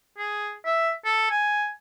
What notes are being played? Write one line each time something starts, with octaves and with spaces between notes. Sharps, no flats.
G#4
E5
A4
G#5